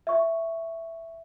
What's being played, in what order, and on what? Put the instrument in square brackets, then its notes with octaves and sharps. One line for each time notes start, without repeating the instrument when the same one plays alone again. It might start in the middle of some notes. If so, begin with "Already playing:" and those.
[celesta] E5 C#6